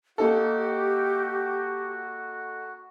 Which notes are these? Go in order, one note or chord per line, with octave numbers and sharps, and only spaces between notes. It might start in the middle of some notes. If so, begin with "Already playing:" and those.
A#3 D#4 F#4 G4 A4